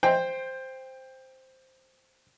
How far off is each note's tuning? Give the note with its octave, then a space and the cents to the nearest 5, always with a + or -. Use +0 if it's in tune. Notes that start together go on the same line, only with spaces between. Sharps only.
C5 +0 G5 +15